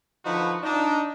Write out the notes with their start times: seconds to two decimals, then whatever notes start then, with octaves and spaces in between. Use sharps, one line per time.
0.25 D3 F3 D#4 F4 F#4 B4
0.63 D4 D#4